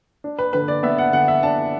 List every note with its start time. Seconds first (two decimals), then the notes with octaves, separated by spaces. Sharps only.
0.24 D4
0.39 B4
0.53 D3 B4
0.68 D5
0.83 B3 E5
0.98 F#5
1.12 D3 F#5
1.28 E5
1.43 D4 A5